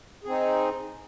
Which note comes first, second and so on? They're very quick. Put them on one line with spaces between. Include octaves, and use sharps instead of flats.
G#4 C4 D#4